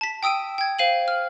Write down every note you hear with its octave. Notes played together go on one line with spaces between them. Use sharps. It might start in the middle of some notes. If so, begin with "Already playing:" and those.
A5 B6
G5 D#6 E6 D7 D#7
G5 G#6
C5 F5 D#7 F#7
F6